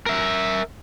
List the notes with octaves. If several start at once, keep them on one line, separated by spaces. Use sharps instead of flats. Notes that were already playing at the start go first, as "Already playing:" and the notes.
A#4 E5